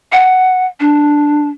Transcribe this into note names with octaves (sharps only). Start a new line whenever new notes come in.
F#5
D4